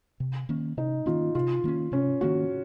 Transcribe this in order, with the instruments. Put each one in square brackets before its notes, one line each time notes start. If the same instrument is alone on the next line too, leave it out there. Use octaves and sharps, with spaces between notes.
[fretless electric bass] C3
D#3 A#3 C#4
[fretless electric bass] C3 [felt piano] D#4
[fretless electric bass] D#3 A#3 C#4 [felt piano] F4
[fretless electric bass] C3 [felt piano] F4
[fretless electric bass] D#3 A#3 C#4
[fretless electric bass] C3 [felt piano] C#4
[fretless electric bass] D#3 A#3 C#4 [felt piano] F#4